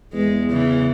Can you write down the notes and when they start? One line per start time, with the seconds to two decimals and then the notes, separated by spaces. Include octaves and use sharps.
0.13 E2 G#3
0.50 C#3 E3